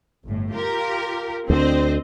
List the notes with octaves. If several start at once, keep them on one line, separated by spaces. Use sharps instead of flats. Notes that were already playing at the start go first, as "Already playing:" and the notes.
G1 A2
F4 G4 A#4
D2 D3 C4 C5 D#5